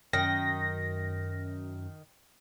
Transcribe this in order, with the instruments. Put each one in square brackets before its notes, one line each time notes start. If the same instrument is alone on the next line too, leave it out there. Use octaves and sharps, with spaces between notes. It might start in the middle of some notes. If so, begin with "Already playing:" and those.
[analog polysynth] F#2 [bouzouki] D#3 [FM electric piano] A#6